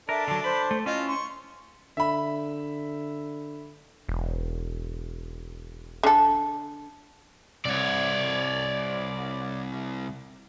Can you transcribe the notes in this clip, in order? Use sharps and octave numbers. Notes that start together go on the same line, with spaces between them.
D4 A4 A#4 E5
D3 F#3 A5
C5 B5
A3
C#4 E4 F4 D#5
C6 C#6
D3 E5 B5
E1
D3 A4
C2 C#5 D5